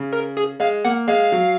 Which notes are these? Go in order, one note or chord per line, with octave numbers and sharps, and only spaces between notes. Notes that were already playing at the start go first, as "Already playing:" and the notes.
Already playing: C#3
A#4
G#4
G#3 F5
A#3 F#5
G#3 F5
F#3